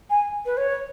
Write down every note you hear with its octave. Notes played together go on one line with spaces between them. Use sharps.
G#5
B4
C#5